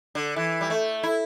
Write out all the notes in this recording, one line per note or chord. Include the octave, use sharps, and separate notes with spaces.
D3
E3
G3
A3
E4